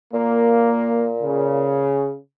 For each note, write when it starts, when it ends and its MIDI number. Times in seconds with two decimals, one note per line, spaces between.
0.13 1.89 46
0.13 1.11 58
1.23 2.17 49